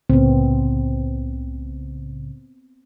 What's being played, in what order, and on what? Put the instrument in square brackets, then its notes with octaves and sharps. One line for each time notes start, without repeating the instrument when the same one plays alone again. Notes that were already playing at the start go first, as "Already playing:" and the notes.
[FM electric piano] C2 A2 C#3 [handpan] B3 C4